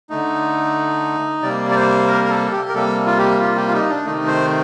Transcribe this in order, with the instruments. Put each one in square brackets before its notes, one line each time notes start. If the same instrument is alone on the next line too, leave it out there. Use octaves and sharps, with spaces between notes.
[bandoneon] D3 A3 D#4
C3 G3 A#3 D5
D5
C5
A#4
A#4
A4
G4
A#4
C3 G3 A#3 A4
F4
G4
F4
G4
F4
D#4
D4
C3 D#3 A3 D#4
C5